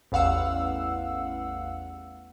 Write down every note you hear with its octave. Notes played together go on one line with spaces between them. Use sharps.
A1 E2 F5 F#5 E6